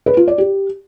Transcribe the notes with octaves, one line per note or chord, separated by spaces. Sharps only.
B4
F4
D5
G4